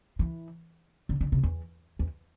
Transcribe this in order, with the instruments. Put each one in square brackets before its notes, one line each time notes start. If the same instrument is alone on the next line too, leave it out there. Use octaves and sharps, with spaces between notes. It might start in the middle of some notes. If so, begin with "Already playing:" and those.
[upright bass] E3
D3
D3
C3
E2
E2